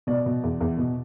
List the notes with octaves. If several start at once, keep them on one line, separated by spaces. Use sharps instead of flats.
B2 D5
B2
E2
E2
B2